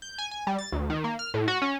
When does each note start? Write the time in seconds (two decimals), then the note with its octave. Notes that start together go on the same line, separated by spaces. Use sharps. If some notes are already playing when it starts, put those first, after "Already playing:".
0.02 G6
0.18 G#5
0.31 G#5
0.47 G3
0.59 A6
0.72 D2
0.90 D#3
1.04 A#3
1.19 F6
1.34 A2
1.48 F#4
1.62 C#4